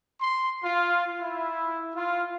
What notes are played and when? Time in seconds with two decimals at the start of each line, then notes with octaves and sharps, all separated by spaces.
0.19 C6
0.62 F4
1.19 E4
1.93 F4